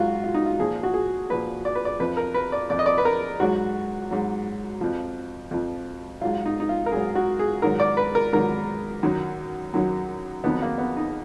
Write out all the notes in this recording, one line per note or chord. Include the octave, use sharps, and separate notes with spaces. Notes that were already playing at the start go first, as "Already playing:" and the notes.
Already playing: G#2 F#3 F4 F#4
F4
D#4
F4
A#2 F3 G#4
F#4
G#4
A#2 F3 B4
D5
B4
D5
F2 F3 B4
A#4
B4
D5
F2 F3 D5
D#5
D5
B4
A#4
G#2 F#3 F#4
G#2 F#3
F2 F3
F2 F3
G#2 F#3 F4
D#4
D#4
F4
A#4
G#2 F#3 G#4
F#4
G#4
G#2 D#3 F#3 A#4
D5
B4
A#4
G#2 D#3 F#3 A#4
F#2 D#3 F#3
F#2 D#3 F#3
F2 D#3 F#3 B3
A#3
B3
D#4